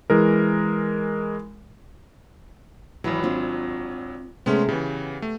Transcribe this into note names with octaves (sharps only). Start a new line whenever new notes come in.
E3 G#3 A#4
G#1 E3 F#3 E4
C4 D4 F4
C3 G#3 A3 B3 C#4
C#3 E3 B3 G4
A3